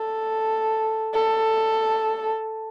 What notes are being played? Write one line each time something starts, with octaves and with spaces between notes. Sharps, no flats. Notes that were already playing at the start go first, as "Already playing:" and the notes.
Already playing: A4
A4